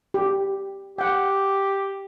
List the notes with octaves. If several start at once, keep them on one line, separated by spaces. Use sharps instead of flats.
G4
G4 F#5 G5